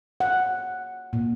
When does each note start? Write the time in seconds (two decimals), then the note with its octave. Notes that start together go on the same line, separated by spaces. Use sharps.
0.20 F#5
1.13 A#2